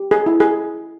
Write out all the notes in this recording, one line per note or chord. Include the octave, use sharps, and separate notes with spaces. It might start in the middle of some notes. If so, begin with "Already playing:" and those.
Already playing: G4
G#4
E4
G#4